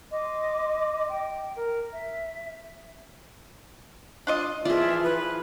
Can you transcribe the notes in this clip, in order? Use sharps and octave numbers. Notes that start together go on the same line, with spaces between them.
D#5 C6 D6
G5
A#4
E5
D4 F4 D#5
E3 F3 F4 G#4 D5 E5
B4